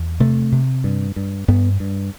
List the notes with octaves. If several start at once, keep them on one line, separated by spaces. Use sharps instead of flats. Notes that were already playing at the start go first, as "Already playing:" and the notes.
Already playing: E2
C3 A3
C3
G2
G2
G2 B3
G2